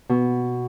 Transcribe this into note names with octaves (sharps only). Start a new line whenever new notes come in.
B2